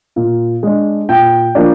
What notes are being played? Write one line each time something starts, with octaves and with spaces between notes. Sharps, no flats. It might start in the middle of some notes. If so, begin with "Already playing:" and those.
A#2
G#3 D4
A#2 G5
F3 A#3 D4